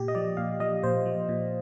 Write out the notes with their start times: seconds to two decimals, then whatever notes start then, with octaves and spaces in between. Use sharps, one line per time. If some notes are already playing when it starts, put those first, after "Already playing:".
Already playing: A#2 G4
0.08 D#5
0.15 F3 D5
0.37 A#2 F5
0.60 F3 D#5
0.83 A#2 C5
1.06 F3
1.29 A#2